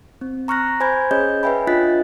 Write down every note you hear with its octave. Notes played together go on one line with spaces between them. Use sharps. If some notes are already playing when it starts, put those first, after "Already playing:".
C4
A#5 C#6 F6 F#6 A#6
C5 G#5 B5 G6 G#6
C#4 G#4 C#5 D#5 G6
B4 C#5 E5 G5 G#5 B5
D4 F4 D#5 F#6 A6 B6